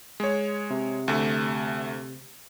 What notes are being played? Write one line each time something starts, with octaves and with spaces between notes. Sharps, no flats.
G#3 C#5
C3
D2 A3